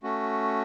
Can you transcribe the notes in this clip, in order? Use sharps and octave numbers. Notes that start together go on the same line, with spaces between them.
A3 C#4 F#4